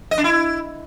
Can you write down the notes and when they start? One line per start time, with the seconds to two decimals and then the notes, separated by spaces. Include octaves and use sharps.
0.11 D#5
0.18 D4
0.24 E4